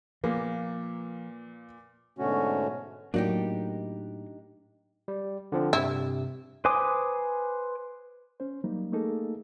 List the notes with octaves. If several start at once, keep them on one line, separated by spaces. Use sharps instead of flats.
A#2 F3 A#3 B3
G#2 B2 D3 A3 C#4 F#4
A2 F#3 A#3 D4 D#4 G4
G3
D3 F3 C4
G2 C3 E4
B4 C5 G#5 D6 D#6
C#4 C5
F#3 G3 A#3 D#4
A3 A#3 D#4 G#4 A4